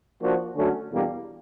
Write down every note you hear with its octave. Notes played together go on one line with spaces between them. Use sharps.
F3 A#3 D4 F#4
D3 F#3 A3 C#4 F#4
E2 B2 G3 A#3 D4